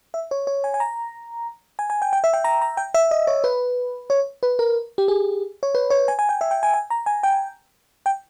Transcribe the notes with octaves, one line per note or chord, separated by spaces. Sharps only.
E5
C#5
C#5
G#5
G#5
A#5
G#5
G#5
G5
G5
E5
G5
A#5
A#5
G5
E5
D#5
C#5
B4
C#5
B4
A#4
G4
G#4
C#5
B4
C#5
G#5
G#5
G5
E5
G5
G#5
G#5
A#5
G#5
G5
G5